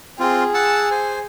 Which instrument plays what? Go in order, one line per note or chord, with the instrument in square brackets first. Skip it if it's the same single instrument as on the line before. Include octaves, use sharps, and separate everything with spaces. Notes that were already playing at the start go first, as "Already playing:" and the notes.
[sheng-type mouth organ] C4 F4 [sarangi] G#4
[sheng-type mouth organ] F#5 A5 E6
C5 G#5